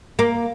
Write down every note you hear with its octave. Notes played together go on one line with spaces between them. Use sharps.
A#3